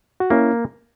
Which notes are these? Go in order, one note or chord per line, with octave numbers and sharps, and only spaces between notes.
F#4
A#3 C#4 E4